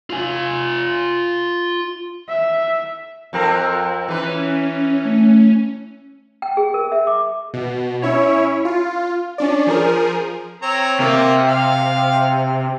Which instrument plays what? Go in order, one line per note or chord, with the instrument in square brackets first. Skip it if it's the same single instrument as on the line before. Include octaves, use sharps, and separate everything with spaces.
[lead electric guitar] F4 G#5
[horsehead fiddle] E5
[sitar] F2 C4 A#4
[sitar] E3 B4 [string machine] C#4
[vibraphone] A3
[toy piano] G5
G#4
A#4
E5
D6
[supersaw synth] B2
C#4 E4 C#5
F4
C#4 D4 D5
F3 G#4 A#4
[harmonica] C4 C#5 A#5
[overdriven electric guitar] C3 [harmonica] A#3
[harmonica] F5